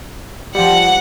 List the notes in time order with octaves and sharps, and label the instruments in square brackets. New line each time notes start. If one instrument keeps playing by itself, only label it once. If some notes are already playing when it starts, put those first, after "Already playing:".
[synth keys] F3 G3 [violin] F#5